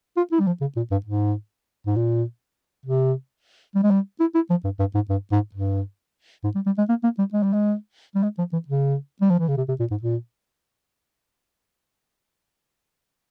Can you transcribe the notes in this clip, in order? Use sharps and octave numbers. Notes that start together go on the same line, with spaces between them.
F4
E4
G3
F3
C#3
A#2
G2
G#2
G#2
A#2
C3
G3
G#3
G3
E4
E4
F3
G2
G2
G#2
G2
G#2
G2
G#2
G3
G3
G#3
A#3
A#3
G3
G#3
G3
G#3
G3
G#3
F3
E3
C#3
G3
F3
E3
C#3
C3
C3
A#2
G#2
A#2